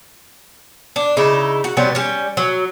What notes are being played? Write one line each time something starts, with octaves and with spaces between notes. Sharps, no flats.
D4
C#3 D#4 E4
F#4
C3 F#3 G3 B3
G3 C#4
F#3